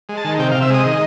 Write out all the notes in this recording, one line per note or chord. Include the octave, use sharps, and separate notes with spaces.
G#3
A5
D#3
C3 G5
F5
C3
E5
G#3 D#5
D#3